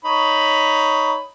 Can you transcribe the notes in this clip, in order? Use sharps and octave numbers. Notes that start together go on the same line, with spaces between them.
D#4 C#5 B5